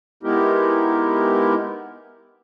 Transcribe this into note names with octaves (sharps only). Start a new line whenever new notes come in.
G#3 B3 D#4 E4 G4 A#4